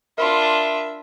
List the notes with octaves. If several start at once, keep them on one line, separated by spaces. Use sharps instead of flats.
D4 F4 A#4 E5 B5 C6